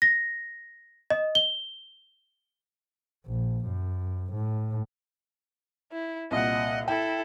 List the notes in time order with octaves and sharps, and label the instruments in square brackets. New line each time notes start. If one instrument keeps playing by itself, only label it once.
[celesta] A#6
D#5
G7
[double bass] A#1
F#2
A2
[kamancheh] E4
[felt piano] C2 A#2 [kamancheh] D#5 F#5
[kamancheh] E4 A4 [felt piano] G5